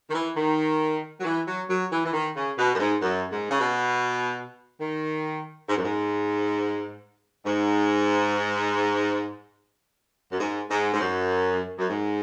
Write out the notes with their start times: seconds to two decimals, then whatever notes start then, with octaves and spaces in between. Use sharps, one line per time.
0.10 D#3
0.14 E3
0.36 D#3
1.20 F#3
1.25 E3
1.47 F#3
1.69 F#3
1.92 E3
2.05 E3
2.13 D#3
2.36 C#3
2.58 B2
2.75 F#2
2.80 G#2
3.02 F#2
3.32 G#2
3.51 C#3
3.61 B2
4.79 D#3
5.69 G#2
5.76 F#2
5.83 G#2
7.45 G#2
10.31 F#2
10.40 G#2
10.70 G#2
10.94 G#2
11.00 F#2
11.78 F#2
11.89 G#2